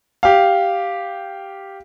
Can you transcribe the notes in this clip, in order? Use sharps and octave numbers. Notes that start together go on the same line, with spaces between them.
G4 F5